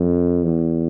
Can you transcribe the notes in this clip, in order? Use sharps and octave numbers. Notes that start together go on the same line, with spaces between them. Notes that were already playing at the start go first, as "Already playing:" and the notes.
Already playing: F2
E2